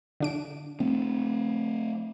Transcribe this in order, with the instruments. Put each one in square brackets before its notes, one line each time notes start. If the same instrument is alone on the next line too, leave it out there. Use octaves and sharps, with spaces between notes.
[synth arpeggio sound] D3 D4 D7
[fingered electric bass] A3 C4